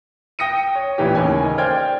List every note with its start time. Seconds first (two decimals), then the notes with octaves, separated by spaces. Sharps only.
0.39 G5 D#6 A#6 C#7 D#7
0.75 C#5
0.98 A1 A#2 E3 G4
1.15 D#2 C#3 C#4 G#5
1.41 D#5 G#5
1.58 C5 D5 G5 F6 G#6